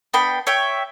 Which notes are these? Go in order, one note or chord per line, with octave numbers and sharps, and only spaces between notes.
B3 D4 G5 B5
C#5 E5 G5